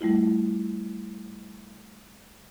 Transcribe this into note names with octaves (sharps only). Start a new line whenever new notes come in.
G3 A3 E4 F4